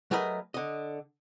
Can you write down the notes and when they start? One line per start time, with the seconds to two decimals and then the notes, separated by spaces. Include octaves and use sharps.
0.11 F#3 A3 G#4 A#4 B4 D#5
0.54 D3 D#5